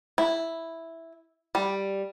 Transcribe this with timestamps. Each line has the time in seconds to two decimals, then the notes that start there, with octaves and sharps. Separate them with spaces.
0.18 E4
1.55 G3